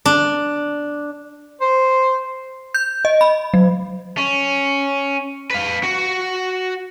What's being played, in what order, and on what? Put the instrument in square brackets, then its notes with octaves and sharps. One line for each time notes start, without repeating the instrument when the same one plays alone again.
[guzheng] D4
[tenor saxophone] C5
[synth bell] G6
D#5
B5
F#3
[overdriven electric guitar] C#4
B4 F5
F#4